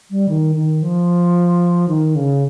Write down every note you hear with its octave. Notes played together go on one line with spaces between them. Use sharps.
G3
D#3
D#3
F3
D#3
C#3